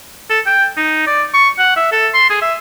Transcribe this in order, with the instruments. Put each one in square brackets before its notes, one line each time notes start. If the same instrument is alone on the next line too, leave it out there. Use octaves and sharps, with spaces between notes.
[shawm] A4
G5
D#4
D5
C#6
F#5
E5
A4
C6
G#4
E5